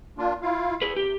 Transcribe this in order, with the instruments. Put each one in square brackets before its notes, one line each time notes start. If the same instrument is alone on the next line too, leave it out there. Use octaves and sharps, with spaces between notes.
[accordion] A#3 D4 F4
E4 F4 F5
[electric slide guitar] G#4 B4
[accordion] C3 [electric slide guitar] G4